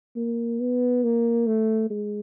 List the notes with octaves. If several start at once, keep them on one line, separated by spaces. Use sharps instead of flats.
A#3
B3
A#3
A3
G#3